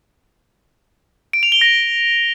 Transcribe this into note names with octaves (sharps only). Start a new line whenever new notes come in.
D7
F7
G7
A#6